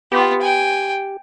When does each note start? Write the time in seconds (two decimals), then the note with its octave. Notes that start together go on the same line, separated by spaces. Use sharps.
0.12 B3 F4 G4
0.41 G5 G#5